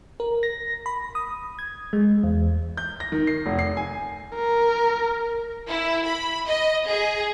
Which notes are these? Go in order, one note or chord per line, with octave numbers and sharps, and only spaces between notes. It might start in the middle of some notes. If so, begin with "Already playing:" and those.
A#4
A#6
B5
D#6
G#6
G#3
E2
G6
A#6
D#3
C7
F1
C7
G#5
A#4
E4
B5
D#5
G#4